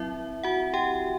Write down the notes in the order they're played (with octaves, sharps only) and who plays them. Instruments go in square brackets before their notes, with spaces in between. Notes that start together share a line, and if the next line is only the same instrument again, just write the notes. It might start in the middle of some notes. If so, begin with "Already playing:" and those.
Already playing: [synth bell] F#3 C4 E4 E5
F#4 F#5
G4 G5